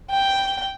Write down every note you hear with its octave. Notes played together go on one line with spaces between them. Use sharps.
G5